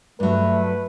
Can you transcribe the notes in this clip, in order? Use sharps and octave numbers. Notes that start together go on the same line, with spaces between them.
G2 F#3 A3 B4